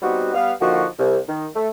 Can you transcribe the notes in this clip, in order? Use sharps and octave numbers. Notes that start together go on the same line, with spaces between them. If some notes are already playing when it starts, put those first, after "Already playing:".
G3 B3 C4 D#4 F#4
G3 B3 B4 F5
D3 F3 A#3 D#4 F#4
C2
D#3
A3